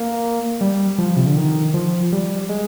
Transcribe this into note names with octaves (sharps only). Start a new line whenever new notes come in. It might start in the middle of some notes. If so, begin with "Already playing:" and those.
Already playing: A#3
G3
F3
C3
D3
D#3
F3
G3
G#3